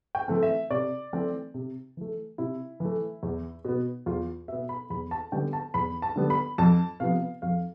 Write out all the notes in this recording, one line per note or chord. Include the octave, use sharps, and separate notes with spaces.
G5
E3 A3 C4
E5
C3 D5
E3 A3 C4
C3
E3 A3
C3 E4
E3 A3
E2
B2 B3
E2 F4
B2 B3 E5
B5
E2 B5
A5
D3 G3 B3 G5
A5
E2 B5
A5
D3 G3 B3
B5
F2 A5
C3 F3 B3 F5
F2 F5